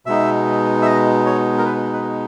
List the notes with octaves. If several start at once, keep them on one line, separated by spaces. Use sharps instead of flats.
B2 G#3 B3 D#4 E5
E5
D#5
C#5
A#4
B4
B4